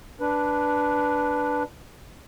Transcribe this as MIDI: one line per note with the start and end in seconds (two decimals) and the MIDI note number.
0.21 1.63 62
0.21 1.63 71